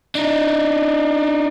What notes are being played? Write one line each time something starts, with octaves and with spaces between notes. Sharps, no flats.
D4 D#4